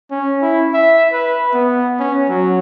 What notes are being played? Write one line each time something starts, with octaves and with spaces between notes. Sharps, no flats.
C#4
E4
E5
B4
B3
C#4
F#3